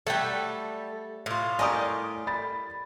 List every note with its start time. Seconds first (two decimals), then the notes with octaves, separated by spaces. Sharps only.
0.07 F#3 G3 A3 A4 F#5 G5
1.26 A2 F4
1.59 G3 G4 A#4 D5 D#5 G#5 C#6 D#6
2.27 B5 A6